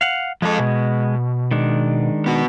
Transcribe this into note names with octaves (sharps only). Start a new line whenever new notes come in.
F5 F#5
F3 G#3 A4
B2
D#3 G#3 D4
B3 F#4